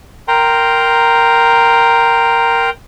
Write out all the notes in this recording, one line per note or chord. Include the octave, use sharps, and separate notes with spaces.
A#4 G5 A#5 C6